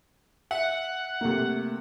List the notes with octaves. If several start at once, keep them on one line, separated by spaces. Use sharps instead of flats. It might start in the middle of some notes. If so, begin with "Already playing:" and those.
E5 F#5
C3 A3 A#3